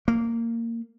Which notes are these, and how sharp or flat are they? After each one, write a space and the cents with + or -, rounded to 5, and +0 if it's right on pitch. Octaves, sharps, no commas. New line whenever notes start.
A#3 -15